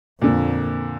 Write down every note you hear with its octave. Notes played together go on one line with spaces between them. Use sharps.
F2 A#2 D3 A#3